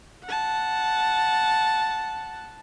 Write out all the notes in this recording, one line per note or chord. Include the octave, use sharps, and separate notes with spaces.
F#5 A5